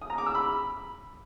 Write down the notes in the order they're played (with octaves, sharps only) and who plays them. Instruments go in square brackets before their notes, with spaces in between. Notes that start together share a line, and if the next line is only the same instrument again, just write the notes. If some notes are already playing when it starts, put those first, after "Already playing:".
[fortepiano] D#6
A#5
D6
E6
B5